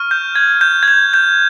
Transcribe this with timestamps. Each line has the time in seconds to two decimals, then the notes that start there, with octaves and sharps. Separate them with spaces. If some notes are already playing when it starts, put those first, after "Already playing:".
Already playing: C#6 F6
0.11 G6
0.36 G#6
0.61 G6
0.83 G#6
0.88 G6
1.14 G6